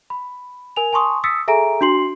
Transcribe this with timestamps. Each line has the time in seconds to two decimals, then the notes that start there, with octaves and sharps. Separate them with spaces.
0.10 B5
0.76 A#4 G#5 F7
0.93 G#5 A5 C6 C#6 D#6
1.24 D#6 E6 A6 B6 C#7
1.48 G#4 A4 E5 G#5 A#5 D7
1.81 D4 F#4 C6 C7 F#7